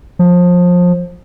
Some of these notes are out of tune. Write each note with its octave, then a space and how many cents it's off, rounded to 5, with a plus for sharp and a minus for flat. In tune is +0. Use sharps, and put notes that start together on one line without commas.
F3 +25